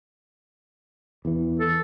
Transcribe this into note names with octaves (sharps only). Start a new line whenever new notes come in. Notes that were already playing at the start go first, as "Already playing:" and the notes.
E2 E3
A4